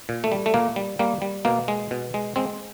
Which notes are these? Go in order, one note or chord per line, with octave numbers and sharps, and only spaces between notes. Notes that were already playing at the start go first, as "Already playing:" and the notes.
A#2
A3
G3
A3
A#2 A#3
G3
G3 A#3
G3
B2 A#3
G#3
B2
G#3
G#3 C4